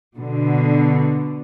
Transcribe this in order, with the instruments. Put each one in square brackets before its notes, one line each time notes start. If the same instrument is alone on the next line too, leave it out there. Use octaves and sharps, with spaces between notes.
[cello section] B2 D3